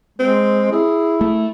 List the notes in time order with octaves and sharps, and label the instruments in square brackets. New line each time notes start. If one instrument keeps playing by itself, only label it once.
[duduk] G#3 [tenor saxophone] C4
[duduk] E4 [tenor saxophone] G#4
[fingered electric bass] A3